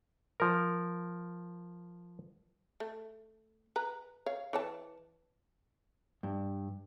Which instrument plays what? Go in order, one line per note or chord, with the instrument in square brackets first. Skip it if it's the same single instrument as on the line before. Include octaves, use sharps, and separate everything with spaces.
[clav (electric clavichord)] F3 A#4
[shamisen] A3
B4 A#5
C#5 F5
E3 C#5 A5
[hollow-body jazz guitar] G2